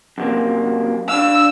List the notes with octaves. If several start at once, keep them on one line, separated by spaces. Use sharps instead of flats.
F#2 C3 A#3
D4 F5 E6